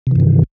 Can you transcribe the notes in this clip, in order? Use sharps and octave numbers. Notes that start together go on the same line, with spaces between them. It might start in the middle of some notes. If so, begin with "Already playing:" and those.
G2 C3 D#3 E3